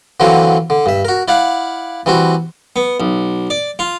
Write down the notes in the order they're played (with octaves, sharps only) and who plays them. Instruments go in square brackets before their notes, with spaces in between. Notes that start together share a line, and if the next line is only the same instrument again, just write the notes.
[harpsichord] D3 E3 F#3 A#3 C4 A#4
D3
G2 E5
F#4 A#4
E4 D5 F5 F#5
E3 G3 C4 F#4
B3
B1
D5
F4